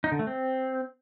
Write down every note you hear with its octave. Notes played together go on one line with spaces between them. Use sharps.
D#4
D3
A3
C4